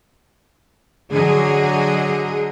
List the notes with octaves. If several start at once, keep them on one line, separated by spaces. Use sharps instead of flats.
D3 F#3 G#4 D#5